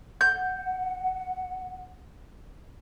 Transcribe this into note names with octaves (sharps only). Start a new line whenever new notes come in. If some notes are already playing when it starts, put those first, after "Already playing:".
F#5 G6